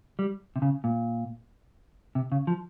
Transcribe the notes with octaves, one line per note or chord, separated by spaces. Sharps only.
G3
C3
C#3
A#2
C3
C#3
F3